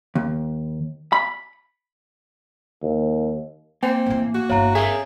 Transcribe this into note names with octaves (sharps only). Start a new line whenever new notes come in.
D#2
B5
D#2
A#3 C4 G#5
A1 A2
F#4
G1 E4 C#5 F5 A#5
G#4 A#4 E5